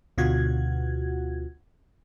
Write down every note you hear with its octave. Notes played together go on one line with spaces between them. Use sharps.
D2 B2 F4 F#4 F#5 G#6